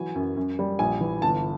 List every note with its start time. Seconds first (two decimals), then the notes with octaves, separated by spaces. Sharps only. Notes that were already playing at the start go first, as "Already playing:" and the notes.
Already playing: E3 F#3 G#5
0.15 F#2
0.37 F#2
0.59 G3
0.79 A#1 G#5
1.01 E3
1.22 G1 A5